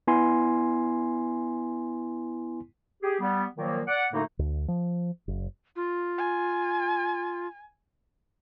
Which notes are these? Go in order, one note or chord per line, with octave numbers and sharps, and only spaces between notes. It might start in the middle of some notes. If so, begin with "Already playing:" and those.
B3 E4 G#5 C6
G4 G#4
G3 B3
A#2 D#3 F3 F#3 A#3
D5 F#5
F#2 A2 D3 A3 A#3 D#4
D2
F3
F#1
F4
G#5